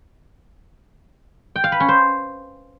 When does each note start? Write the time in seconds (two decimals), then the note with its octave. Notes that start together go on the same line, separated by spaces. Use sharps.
1.56 G5
1.64 F5
1.72 B4
1.80 C#4
1.89 C5